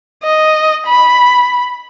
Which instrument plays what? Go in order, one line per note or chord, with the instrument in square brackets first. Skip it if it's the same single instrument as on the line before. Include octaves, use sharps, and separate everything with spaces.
[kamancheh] D#5
B5